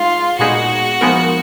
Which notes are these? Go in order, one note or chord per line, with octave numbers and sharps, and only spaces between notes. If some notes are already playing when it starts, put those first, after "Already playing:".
Already playing: G#3 D#4 F4 G#4
A#2 G#3 B3 D#4 F#4 G#4
F3 G#3 B3 D#4 A#4